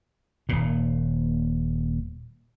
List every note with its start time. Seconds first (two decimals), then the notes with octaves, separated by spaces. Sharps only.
0.49 D#1 A#2